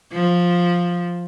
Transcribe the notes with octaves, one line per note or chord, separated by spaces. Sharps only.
F3